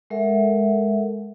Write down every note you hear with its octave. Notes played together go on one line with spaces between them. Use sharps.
G#3 A4 A#4 E5 F#5